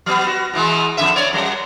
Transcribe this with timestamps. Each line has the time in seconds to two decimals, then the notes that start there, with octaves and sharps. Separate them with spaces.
0.06 F#3 B3
0.27 F#4
0.54 B2 E3 G#3
0.97 F2 D3 E5
1.16 B3 C#5 D5
1.33 F#2 G3